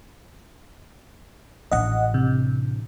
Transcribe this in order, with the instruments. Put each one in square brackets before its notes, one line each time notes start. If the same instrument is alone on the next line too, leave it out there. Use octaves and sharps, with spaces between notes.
[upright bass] A1 D4 [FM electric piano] D#5 F#5
[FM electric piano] C3